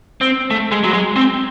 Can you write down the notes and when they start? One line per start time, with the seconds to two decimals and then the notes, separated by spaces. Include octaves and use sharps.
0.21 C4
0.51 A3
0.71 G#3
0.84 F#3
0.93 G#3
1.16 C4